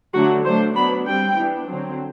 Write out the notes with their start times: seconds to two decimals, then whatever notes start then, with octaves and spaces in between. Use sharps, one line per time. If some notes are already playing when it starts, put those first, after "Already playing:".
0.13 D3 F#3 A3 D4 F#4
0.44 F#3 A3 D4 C5
0.75 F#3 B3 D4 B5
1.05 G3 C4 G5
1.36 E3 B3 D4
1.67 D3 F#3 C4